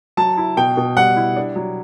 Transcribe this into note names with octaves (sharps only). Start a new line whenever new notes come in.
F#3 A5
E4
B2 G5
B2
G3 F#5
E4
D4
F#3